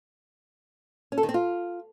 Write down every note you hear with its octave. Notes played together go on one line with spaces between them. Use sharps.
C#4
A4
D#3
C4
F4